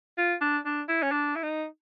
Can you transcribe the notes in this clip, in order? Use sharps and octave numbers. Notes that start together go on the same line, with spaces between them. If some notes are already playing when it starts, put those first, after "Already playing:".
F4
D4
D4
E4
C#4
D4
E4
D#4